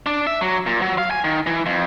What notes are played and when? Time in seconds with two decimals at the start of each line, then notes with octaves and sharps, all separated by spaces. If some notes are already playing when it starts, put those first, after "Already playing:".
0.06 D4
0.27 E5
0.41 F#3
0.66 A#2
0.82 F#3
0.98 F5
1.11 G#5
1.24 D#3
1.47 E3
1.66 F2